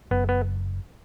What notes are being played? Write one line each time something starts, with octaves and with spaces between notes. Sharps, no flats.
F#1 B3
B3